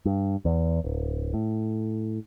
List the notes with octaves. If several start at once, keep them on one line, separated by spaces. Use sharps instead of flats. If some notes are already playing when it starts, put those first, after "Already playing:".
G2
E2
D1
A2